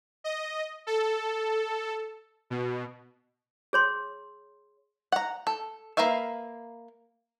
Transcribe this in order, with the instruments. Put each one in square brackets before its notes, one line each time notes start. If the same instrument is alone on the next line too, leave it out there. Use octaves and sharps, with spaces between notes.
[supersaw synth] D#5
A4
B2
[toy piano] G#4 C#5 C6
[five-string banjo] F#5 A#5
A4
A#3 A#4 B4 E5 F5